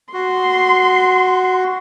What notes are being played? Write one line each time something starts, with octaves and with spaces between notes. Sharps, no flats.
F#4 C6